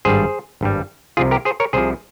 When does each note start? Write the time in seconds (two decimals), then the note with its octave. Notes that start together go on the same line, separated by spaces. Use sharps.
0.05 G#1 G2 G3 G#4 C5
0.61 G#1 G2 G3
1.17 C2 C3 F3 F4 G#4
1.31 G4 A#4
1.45 G#4 C5
1.60 A#4 C#5
1.73 C2 C3 F3 G#4 C5